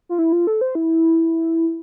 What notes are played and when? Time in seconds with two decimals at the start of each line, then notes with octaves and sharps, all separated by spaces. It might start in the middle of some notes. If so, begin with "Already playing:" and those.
0.09 F4
0.19 E4
0.32 F4
0.47 A4
0.61 C5
0.75 E4